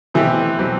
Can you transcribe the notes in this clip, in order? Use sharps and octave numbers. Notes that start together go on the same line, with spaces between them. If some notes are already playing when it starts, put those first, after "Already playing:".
B2 E3 A3 C4 E4 G4
B2 F#3 C4 G4